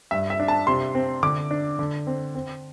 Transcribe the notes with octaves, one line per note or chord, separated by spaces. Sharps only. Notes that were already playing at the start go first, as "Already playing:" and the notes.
G2 E5
E5
D4
A5
C3 C6
C4
D3 D6
D4
D3
C4
C4